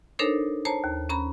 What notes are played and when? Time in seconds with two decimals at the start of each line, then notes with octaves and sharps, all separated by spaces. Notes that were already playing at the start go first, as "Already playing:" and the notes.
0.19 D4 D#4 A4 A#4 C5 C#5
0.65 C5 C#5 A5 A#5
0.84 D#2
1.09 C#4 A#5 B5